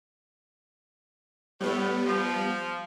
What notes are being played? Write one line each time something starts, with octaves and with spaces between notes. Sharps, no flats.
A2 G3 B3
F3